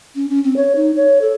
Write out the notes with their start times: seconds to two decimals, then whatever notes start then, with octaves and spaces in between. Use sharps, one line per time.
0.16 C#4
0.29 C#4
0.44 C4
0.56 C#5
0.76 D#4
0.96 C#5
1.21 A4